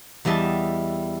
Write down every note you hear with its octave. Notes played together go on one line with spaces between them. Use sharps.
E2 G3 D#5 E5 A5